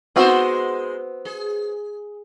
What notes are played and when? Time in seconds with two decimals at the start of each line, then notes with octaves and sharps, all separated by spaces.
0.16 G#3 B3 C4 D#4 F#4 C5
1.25 G#4